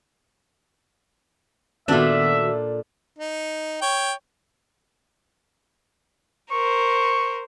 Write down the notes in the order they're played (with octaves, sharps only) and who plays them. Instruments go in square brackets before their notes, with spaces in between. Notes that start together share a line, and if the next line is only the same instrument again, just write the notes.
[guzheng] A#2 D4 [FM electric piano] D#3 B3 F#4 [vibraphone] A4 [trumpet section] E5
[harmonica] D#4
C#5 G5
[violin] A#4 C5 [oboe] C#6